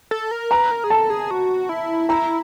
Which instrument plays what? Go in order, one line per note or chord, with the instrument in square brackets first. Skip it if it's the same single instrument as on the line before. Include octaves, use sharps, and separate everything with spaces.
[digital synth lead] A4
A#4
[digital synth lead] B4 [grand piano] A#5
[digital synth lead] A#4
G#4
[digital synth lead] A4 [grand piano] A5
[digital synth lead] G#4
F#4
E4
[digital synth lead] E4 [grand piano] A#5